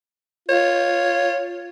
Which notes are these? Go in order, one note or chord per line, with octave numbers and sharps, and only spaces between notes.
F4 C#5